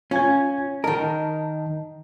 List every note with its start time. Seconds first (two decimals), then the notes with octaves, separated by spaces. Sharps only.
0.11 C#4 F4 G#5 G#6
0.84 D#3 A#4 D#5 A5 A#5